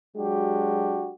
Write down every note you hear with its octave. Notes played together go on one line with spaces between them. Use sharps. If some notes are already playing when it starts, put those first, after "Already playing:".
F#3 G#3 D4 F#4 G4